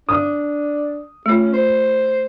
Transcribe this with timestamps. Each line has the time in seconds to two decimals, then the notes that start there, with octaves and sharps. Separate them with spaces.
0.09 D4 D#6
1.26 A3 C#4 F4
1.53 C5